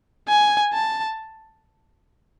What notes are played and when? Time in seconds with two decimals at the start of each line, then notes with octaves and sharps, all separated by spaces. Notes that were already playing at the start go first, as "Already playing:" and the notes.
0.29 G#5
0.73 A5